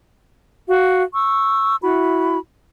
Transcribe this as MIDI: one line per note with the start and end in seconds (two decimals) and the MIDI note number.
0.68 1.03 66
0.68 1.03 77
1.13 1.75 85
1.13 1.75 88
1.83 2.37 64
1.83 2.37 66
1.83 2.37 83